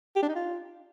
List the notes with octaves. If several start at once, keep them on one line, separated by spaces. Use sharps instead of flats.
G4
D4
D#4
F4